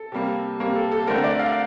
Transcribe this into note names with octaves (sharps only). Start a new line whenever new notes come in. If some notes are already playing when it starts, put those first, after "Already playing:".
Already playing: A4
C3 G3 A#3
C3 G3 A#3
A4
A4
D3 A3 C4 A#4
D5
F5